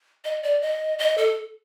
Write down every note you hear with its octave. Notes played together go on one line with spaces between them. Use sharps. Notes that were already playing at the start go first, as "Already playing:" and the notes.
D#5
D5
D#5
D#5
A4